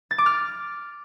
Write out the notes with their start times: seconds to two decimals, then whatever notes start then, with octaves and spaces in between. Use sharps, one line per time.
0.11 A6
0.18 D6
0.26 F6